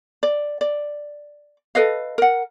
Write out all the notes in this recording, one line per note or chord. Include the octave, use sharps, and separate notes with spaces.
D5
D5
A4 B4 D#5 F5
A#4 F#5